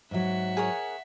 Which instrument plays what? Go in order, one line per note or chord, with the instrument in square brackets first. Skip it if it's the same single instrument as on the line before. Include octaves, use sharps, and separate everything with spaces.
[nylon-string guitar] G#2 F#3 [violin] E5 F#5
[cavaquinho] G#4 A#4 C#5